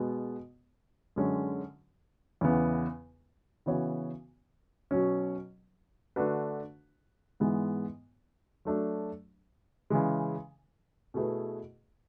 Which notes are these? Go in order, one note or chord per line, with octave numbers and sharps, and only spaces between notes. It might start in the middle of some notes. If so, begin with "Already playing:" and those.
Already playing: B2 G#3 B3
F#2 D3 G#3 C#4
E2 C#3 E3 B3
C#3 E3 B3 F#4 C#5
B2 F#3 C#4
D3 A3 D4 F#4 B4
G#2 E3 G#3 B3
F#3 A3 D4
C#3 E3 G#3
B2 A3 E4 G#4 B4